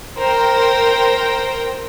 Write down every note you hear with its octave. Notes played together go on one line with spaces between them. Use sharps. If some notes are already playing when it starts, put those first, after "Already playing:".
A#4 C5 G5